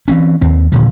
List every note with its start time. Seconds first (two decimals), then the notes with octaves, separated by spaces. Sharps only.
0.08 E3 C4 C#4
0.41 D#2 C4
0.72 D#1 A#2 D3 F3